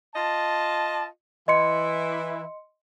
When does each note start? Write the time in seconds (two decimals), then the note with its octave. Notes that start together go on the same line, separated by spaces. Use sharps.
0.15 F4 D#5 A5
1.48 E3 E4 D#5 C6 C#7